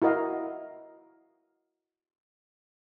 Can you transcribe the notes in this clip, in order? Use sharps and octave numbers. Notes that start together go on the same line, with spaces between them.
E4 F#4 A#4 D#5 F5